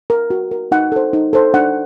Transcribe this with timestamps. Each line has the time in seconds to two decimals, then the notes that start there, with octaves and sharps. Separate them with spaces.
0.10 A#4
0.30 F#4
0.51 A#4
0.72 D#4 F#5
0.92 A4 C5
1.13 D#4
1.33 A4 C5
1.54 D4 F#5